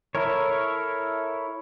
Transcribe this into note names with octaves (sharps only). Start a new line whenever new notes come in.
E4 A4 A#4 C#5